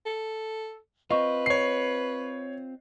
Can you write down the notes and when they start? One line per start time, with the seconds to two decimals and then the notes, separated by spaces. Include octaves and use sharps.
0.06 A4
1.11 C4 F4 B4 D#5 C#6
1.46 C#5 C7